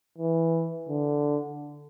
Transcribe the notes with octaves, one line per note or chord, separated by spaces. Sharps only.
E3
D3